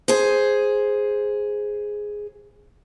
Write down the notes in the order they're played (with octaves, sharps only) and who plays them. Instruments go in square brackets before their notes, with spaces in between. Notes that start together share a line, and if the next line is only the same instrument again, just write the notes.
[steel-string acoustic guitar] G#4 C5